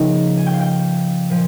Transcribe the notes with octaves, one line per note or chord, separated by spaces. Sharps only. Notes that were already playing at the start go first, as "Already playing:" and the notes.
Already playing: C#3 F3 A#3 D#4 A#4
G#5
G5
F5
G5
A#2 F3